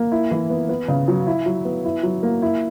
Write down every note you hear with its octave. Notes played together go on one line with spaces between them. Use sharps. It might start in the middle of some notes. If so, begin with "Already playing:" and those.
Already playing: A#3
E4
E3
B3
B3
C#3
F#3
E4
F#3
B3
E4
F#3
A#3
E4